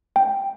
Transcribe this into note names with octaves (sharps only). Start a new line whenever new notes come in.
G5